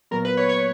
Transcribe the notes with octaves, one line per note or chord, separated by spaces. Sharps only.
A#2 F#3 B3 A#4
B4
C#5
C#5